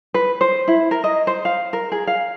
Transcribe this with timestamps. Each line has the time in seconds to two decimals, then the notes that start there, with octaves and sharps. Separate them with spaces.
0.14 B4
0.41 C5
0.68 E4
0.91 A#4
1.04 D#5
1.27 C5
1.45 F5
1.73 A#4
1.92 G#4
2.07 F5